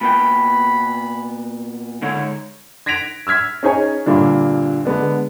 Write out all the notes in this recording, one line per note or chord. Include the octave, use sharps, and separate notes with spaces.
A#2 B3 G5 B5
G#2 D3 D#4 C#5
G#6 A#6 B6 D7 F7
E6 F6 G#6 B6
C#4 D#4 G#4 C#5 G#5 C#6
G2 A#2 D3 D4
D3 G#3 B3 D4